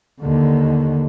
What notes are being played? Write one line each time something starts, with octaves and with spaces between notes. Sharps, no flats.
D#2 D3